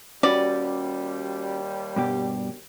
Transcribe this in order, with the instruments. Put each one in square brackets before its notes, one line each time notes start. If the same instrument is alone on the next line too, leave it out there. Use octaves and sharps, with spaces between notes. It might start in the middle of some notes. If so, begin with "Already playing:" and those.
[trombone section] D#2 G3 [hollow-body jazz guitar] C#4 F#4 B4 [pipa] D5
[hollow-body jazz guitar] G2 B2 G4